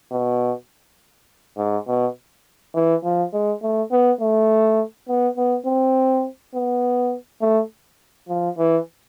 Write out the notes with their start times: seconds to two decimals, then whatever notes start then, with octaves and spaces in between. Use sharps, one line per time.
0.12 B2
1.57 G#2
1.87 B2
2.75 E3
3.04 F3
3.33 G#3
3.62 A3
3.91 B3
4.21 A3
5.08 B3
5.37 B3
5.66 C4
6.54 B3
7.41 A3
8.29 F3
8.58 E3